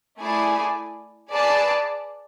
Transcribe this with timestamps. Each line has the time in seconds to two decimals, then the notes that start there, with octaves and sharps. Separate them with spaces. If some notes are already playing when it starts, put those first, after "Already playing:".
0.20 A3 E4 G#4 D5 G#5
1.30 G#4 B4 D5 A5